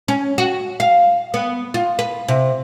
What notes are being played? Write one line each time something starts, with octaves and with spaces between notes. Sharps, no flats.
C#4
F#4
F5
B3
F4
B4
C3